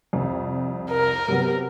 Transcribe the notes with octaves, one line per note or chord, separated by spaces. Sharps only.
C2 F2
A#4
C3 F#3 B3